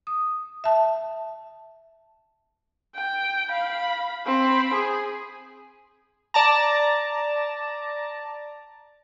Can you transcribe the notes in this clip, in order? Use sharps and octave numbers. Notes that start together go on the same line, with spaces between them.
D#6
E5 A5
G5
F5 B5
C4 B5
G#4
D5 A5 A#5